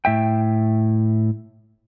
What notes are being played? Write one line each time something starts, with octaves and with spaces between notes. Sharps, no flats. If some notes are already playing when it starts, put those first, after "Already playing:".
A2 E5 G5